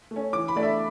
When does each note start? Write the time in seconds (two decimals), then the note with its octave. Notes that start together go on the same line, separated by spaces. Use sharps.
0.11 A3
0.16 C#4
0.33 E3 D6
0.48 B5
0.56 A3 D4 D5
0.63 E5